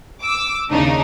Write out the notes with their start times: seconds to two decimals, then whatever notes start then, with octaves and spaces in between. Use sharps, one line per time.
0.24 D6 E6
0.71 D#2 C#3 D4 D#4